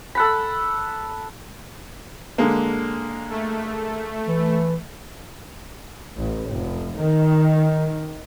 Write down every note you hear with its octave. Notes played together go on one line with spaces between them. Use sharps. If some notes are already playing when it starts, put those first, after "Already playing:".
A4 F#5 B5
D3 G#3 A#3
A3
E3
A1
F1
D#3